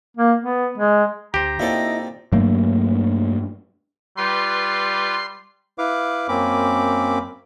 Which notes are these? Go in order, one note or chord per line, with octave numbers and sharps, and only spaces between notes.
A#3
B3
G#3
D2 G4 C5 A#5
A#2 C4 D#4 E4 A4
G2 F#3 A3 A#3
G3 F4 B4 C6
E4 B4 F5 D6
F#2 A#3 C4 C#4 B5 D6